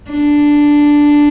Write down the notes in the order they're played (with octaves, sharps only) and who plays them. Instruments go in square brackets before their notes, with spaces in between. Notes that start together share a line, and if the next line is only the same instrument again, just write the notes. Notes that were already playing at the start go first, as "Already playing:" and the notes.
[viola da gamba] D4